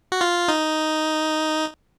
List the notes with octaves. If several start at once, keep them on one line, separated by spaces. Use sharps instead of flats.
F#4
F4
D#4